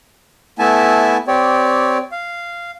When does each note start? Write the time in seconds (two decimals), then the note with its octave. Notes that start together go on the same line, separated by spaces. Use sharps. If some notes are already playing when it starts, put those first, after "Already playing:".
0.59 A3 B3 E4 E5 G#5 A5
1.27 C4 G4 C#5 D5
2.12 F5